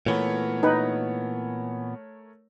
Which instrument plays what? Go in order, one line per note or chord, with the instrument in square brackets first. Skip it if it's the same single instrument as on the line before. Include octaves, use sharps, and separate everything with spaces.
[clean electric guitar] A#2 E3 B3 [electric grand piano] A3 A#4 C#5
[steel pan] D#4 B4